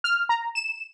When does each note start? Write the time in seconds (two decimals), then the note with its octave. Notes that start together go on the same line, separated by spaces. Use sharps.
0.04 F6
0.29 A#5
0.55 E7